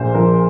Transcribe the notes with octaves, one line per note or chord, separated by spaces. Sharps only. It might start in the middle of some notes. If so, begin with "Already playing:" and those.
Already playing: A#1 A#2 C5
F3 A#4